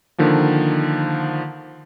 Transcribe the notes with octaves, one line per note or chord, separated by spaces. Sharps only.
D3 D#3 F3 A#3